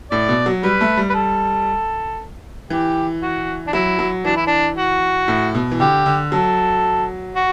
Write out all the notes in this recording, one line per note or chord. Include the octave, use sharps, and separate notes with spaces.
A2 D5
B2
F#3
G3 B4
A3
G3
B4
A4
E3 G4
F#4
D4
F#3 E4
F#3
E3 D4
E4
D4
F#4
A2
B2
E3
D3 G4
D3
F#3 A4
F#4